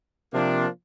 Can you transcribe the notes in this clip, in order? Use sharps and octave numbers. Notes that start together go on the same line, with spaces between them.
C3 F3 A#3 D4